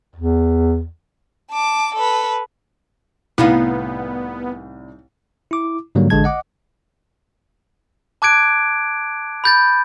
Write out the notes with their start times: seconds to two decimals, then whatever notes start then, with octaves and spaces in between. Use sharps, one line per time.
0.16 E2
1.51 A5 D6
1.95 A4 B4
3.38 C2 A2 G3 B3 D#4 E4 F5
5.51 E4 D6
5.95 G#2 D3 F#3 G3 A#3
6.10 A1 D3 G#3 A5 G#6
6.24 D#5 F#5 D6
8.22 A5 D6 F#6 G#6 D7
9.44 B5 G6 A6